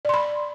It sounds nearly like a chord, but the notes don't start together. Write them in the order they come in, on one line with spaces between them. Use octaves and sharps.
D5 C6 B5